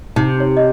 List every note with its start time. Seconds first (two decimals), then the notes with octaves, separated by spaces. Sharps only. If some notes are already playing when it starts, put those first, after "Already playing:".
0.16 C3 D#4
0.40 C#5
0.57 D#5